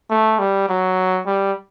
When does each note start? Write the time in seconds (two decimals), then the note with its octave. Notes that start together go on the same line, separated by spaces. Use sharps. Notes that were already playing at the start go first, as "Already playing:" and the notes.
0.10 A3
0.39 G3
0.69 F#3
1.26 G3